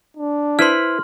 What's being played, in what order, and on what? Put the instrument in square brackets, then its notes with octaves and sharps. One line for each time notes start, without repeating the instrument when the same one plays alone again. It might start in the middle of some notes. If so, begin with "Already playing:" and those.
[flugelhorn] D4
[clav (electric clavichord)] E4 B4 C5 [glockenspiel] C6 F6